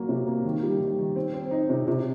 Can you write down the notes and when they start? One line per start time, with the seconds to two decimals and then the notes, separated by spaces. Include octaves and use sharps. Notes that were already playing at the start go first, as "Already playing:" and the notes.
Already playing: F#3 A#3
0.09 C3
0.27 A#3
0.45 D#3
0.63 G3
0.80 D#3
0.98 D#3
1.16 C4
1.34 C4
1.51 D#4
1.69 C3
1.87 C3